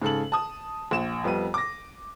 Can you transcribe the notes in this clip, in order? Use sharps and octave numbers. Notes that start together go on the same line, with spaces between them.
G#2 C#3 A4 F#7
A5 D#6
A#1 E7
F2 G3 B3 D#7
D6 A#6